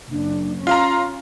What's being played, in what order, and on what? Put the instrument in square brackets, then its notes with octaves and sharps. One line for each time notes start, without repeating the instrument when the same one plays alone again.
[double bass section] F#1 [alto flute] D4
[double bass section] C#4 [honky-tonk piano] F4 F5 A#5 [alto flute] C6